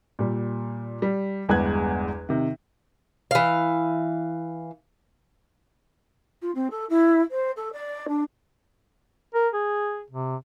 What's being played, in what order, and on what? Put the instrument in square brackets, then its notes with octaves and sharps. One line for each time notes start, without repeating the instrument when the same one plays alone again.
[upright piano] A#2 G3
G3
G1 E2 G#3 B4 F#6 G#6
C3 D#3
[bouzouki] E3 F5
[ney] F4
C4
A4
E4
C5
A4
D5
D4
[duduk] A#4
G#4
C3